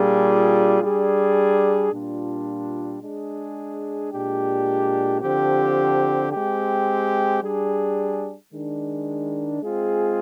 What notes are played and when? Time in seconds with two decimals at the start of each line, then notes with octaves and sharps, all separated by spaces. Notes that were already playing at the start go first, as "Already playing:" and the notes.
Already playing: A#2 G3 D4 F4 G#4
0.82 G3 D4 G#4
1.92 A#2 G3 D4 F4
3.01 G#3 D4 G#4
4.12 A#2 G#3 D4 G4
5.21 D3 F3 C4 G4
6.31 G#3 C4 G4
7.41 G3 D4 G#4
8.51 D#3 G#3 D4
9.61 G#3 C4 F4 G#4